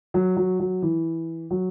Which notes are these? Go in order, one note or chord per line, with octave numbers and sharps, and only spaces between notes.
F#3
F#3
F#3
E3
F#3